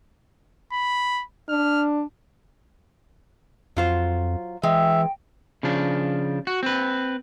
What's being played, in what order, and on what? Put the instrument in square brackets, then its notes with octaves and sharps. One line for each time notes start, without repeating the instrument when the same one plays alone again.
[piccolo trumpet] B5
[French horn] D4 [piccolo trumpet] F6
[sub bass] F2 [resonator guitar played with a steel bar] F#3 F4 C5
[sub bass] E3 [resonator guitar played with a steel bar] G#3 [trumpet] E5 [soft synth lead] G5
[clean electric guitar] C#3 F3 D4
F#4
C4 B4